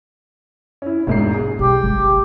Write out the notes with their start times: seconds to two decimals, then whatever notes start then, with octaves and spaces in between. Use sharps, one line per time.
0.82 C#4 E4
1.07 E1 G#2 D4 C7
1.34 G#4
1.59 B1 G4
1.83 G1